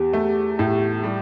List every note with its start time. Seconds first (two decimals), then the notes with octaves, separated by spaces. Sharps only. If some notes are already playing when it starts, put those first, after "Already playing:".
Already playing: E2 G4
0.13 A3
0.59 A2
1.04 G3